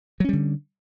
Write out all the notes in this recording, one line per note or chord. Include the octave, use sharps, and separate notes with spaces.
D3 F#3 G3 C#4